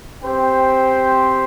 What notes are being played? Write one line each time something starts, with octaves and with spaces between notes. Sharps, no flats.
C4 G4 C5 G5